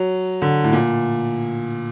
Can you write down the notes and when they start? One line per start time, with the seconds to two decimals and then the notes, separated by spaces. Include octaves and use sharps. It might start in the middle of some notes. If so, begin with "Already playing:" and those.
Already playing: F#3
0.42 D3
0.64 A2
0.73 A#2